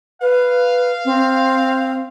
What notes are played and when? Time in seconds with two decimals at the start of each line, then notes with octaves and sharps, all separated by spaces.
0.21 B4 F5
1.05 C4